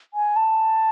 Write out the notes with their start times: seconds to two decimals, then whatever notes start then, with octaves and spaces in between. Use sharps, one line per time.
0.14 G#5
0.36 A5